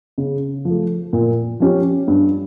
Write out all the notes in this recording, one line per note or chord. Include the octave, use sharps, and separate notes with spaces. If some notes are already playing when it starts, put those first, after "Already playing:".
C#3
F3 A3
A#2
F3 C#4 G4
G2